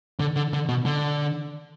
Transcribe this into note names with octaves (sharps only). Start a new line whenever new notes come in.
D3
D3
D3
B2
D3